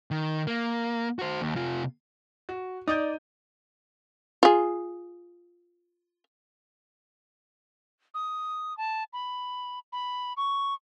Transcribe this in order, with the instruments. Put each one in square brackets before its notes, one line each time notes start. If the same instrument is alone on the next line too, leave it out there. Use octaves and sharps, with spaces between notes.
[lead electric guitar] D#3
A#3
F#4 C5
D#2
C3 F4
[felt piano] F#4
[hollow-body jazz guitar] D#4 [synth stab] D5 [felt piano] D#6 G6
[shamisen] F4 G#4
[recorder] D#6
A5
B5
B5
C#6